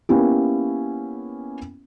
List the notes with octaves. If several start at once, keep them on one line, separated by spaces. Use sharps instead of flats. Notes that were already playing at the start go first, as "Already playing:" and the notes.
A#3 B3 C#4 E4 G4